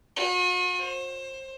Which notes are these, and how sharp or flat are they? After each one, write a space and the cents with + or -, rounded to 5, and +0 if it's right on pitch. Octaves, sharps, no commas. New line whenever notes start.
F#4 -45
C5 +25